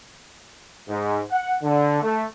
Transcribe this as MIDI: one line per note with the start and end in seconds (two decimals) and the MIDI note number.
0.88 1.21 44
1.31 1.54 78
1.63 2.02 50
2.03 2.24 57